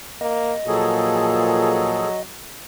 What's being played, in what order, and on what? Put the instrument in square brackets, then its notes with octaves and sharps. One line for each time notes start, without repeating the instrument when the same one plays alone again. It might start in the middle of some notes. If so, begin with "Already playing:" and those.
[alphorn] A#3 [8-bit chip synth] D#5
[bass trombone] A#2 [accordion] F3 G#4 A4 [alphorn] F#3